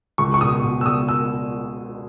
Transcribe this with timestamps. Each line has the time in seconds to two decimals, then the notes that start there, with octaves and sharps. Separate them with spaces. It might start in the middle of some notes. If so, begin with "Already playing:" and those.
0.18 C#2 C#6
0.34 C#6
0.41 B2 D#6
0.64 B2
0.81 E6
0.86 C#2 D#6
1.09 E6